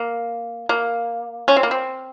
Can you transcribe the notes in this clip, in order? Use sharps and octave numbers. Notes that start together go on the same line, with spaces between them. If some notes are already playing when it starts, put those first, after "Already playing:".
Already playing: A#3
A#3
C#4
C4
A#3
C4